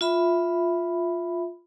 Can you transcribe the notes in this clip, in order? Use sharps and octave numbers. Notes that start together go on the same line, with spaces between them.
F4 E5 B5